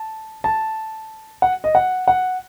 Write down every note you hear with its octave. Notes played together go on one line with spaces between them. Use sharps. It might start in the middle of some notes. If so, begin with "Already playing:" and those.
Already playing: A5
A5
F#5
D#5
F#5
F#5